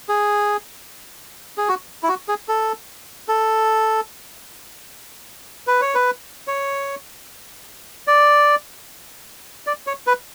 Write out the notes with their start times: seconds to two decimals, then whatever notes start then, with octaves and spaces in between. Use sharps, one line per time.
0.09 G#4
1.58 G#4
1.69 F#4
2.03 E4
2.09 F#4
2.28 G#4
2.48 A4
3.29 A4
5.67 B4
5.81 C#5
5.95 B4
6.47 C#5
8.07 D5
9.67 D5
9.87 C#5
10.07 B4